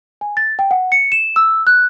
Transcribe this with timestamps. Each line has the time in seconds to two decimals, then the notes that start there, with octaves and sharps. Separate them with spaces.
0.21 G#5
0.37 A6
0.59 G5
0.71 F#5
0.92 C#7
1.12 E7
1.36 E6
1.67 F#6